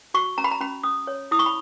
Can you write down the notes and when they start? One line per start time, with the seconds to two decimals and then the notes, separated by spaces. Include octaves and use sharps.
0.14 F#4 C#6
0.38 C#4 A#5
0.44 B5
0.51 A#5
0.61 C#4 B5
0.83 C#4 D#6
1.07 C#5
1.31 E4 D#6
1.39 C#6
1.46 B5